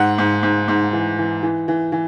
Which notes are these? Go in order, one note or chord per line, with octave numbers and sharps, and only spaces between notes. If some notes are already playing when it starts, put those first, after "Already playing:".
Already playing: G#2 F#5
G#2
G#2
G#2
E3
E3
E3
E3
E3